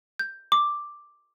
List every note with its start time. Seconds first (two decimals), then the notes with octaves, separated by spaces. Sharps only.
0.19 G6
0.52 D6